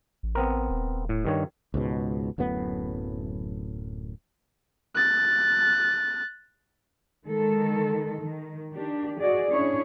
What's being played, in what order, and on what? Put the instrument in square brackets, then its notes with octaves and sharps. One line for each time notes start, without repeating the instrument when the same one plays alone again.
[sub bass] A1
[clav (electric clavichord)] B3 C4 A#4
[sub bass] D#1
[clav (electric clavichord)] A2
G2 D#3 C#5
[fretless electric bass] C#2 G#2 B2
D1 F#2 A2 B3
[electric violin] F#6 A6
[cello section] D#3 G#3 A4
D#3
D#3 D4 G4
F#4 G#4 D5 D#5
C#4 D4 E4 G#4 C#5